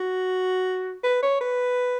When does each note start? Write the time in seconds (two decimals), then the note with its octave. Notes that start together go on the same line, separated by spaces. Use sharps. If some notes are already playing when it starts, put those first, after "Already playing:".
Already playing: F#4
1.03 B4
1.23 C#5
1.41 B4